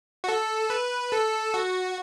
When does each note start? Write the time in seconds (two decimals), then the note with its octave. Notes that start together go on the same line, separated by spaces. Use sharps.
0.24 F#4
0.28 A4
0.70 B4
1.12 A4
1.54 F#4